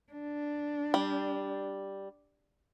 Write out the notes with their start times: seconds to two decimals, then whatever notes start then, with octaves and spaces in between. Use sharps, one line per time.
0.13 D4
0.94 G3